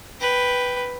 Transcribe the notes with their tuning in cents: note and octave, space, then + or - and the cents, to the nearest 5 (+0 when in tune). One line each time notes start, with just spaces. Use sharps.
B4 +0 G5 +0